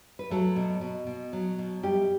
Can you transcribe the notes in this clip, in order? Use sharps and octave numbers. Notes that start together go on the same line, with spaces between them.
B4
F#3 A3 A4
B2
B2
B2
F#3
B2
F#2 G3 G4